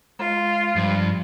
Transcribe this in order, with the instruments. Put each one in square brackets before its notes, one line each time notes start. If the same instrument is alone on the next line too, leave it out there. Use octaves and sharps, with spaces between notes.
[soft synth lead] G#3 [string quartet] F4
[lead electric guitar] G2 [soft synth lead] F3